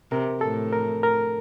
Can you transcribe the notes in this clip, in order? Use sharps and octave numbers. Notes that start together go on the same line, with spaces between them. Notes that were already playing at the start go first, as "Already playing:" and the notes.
C3 A#4
A2 A4
A#4
A#4